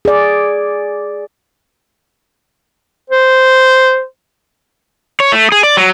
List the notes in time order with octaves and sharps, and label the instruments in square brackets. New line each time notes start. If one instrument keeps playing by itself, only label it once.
[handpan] G#4 D5
[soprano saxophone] C5
[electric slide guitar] C#5
A3
G#4
D5
F#3